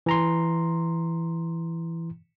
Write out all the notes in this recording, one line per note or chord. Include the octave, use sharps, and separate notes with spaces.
E3 A#5 C6